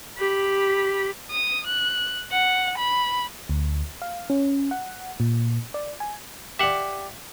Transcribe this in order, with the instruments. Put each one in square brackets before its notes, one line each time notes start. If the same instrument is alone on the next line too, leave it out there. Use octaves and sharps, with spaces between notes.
[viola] G4 B5
[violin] D#6
F#6
F#5
B5
[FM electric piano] D2
F5
C#4
F#5
A#2
D5
G#5
[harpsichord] G4 D5 [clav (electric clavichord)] E5 F#5